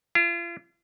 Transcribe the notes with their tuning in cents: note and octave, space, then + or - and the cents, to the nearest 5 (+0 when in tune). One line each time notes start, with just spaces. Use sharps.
F4 -40